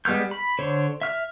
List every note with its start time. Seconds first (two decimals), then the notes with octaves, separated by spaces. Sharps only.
0.05 G3 G#3 B3 F6 G6
0.31 B5
0.59 D3 C5 C#5
1.01 E5 F6